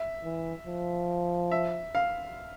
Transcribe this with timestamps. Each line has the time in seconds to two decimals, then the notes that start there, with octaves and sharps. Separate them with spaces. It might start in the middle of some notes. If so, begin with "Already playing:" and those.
Already playing: E5
0.24 E3
0.67 F3
1.51 E5
1.95 F5